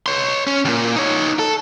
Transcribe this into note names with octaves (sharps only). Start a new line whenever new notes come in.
C#5 C6
C#4
D#2 A#2
D#4 C#5
A4